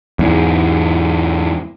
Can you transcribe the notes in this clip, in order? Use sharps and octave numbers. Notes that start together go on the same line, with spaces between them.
E2 G#2